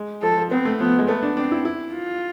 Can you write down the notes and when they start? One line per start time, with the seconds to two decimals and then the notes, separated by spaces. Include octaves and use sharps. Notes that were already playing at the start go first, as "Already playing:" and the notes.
Already playing: G#3
0.22 F3 A4
0.37 F3
0.51 B3 C4
0.65 A3
0.80 F3 B3
0.99 G#3
1.08 A3 B3
1.23 D4
1.37 C4 D4
1.52 E4
1.65 E4
1.94 F4